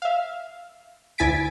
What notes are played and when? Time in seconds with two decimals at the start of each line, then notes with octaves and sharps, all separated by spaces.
0.02 E5 F5
1.18 D2 E4 G#5 A6 B6 D7